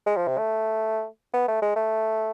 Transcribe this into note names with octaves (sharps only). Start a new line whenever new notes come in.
G#3
F3
C3
A3
B3
A3
G#3
A3